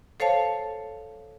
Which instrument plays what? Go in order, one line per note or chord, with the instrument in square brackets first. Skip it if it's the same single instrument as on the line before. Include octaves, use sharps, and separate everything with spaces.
[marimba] A4 C5 C#5 F5 A5